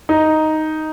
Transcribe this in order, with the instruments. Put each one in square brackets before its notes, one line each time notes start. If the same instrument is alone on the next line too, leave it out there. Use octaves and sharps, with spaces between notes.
[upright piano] D#4